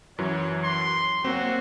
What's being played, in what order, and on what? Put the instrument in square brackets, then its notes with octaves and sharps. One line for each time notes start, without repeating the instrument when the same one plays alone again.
[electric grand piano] F#2 E3 F#3 [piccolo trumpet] C#5
[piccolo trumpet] C6
[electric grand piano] F#3 A#3 C4 [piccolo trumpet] F#4